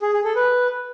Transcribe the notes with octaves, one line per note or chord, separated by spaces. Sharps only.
G#4
G#4
A4
B4